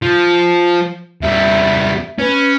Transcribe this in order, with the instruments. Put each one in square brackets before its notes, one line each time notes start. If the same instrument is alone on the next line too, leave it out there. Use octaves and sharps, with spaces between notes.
[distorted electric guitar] F3
[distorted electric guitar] E2 G3 [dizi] E5
[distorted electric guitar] C#4 [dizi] B4